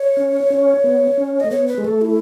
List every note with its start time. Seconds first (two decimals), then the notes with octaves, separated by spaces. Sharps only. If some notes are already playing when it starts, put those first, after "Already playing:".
Already playing: C#5
0.17 C#4
0.50 C#4
0.84 B3
1.18 C#4
1.40 A3 D#5
1.51 B3 C#5
1.68 B4
1.78 G#3
1.84 A3 A4
2.02 E4